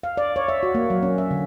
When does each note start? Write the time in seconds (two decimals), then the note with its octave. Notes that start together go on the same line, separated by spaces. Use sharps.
0.03 F5
0.17 D5
0.36 C#5
0.48 E5
0.63 F#4
0.75 A#3
0.90 F#3
1.03 C#4
1.18 E5
1.31 D3